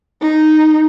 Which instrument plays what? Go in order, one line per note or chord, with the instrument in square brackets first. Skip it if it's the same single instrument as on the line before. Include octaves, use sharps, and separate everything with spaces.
[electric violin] D#4